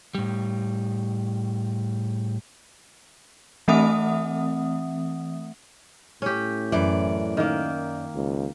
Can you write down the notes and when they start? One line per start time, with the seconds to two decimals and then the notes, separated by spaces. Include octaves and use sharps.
0.15 A2 G3
3.68 E3 A3 C4 E5 F#5 D#6
6.22 A2 C#4 G4
6.72 F#2 E3 D5
7.37 D#3 A#3
8.15 C#2